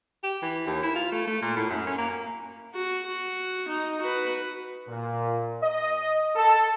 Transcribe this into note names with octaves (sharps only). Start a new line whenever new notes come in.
G4
E3
D#2
E4
F4
A3
A3
A#2
A2
F#2
C#4
A#3
F#4
F#4
D#4
F#4 B4
A#2
D#5
A4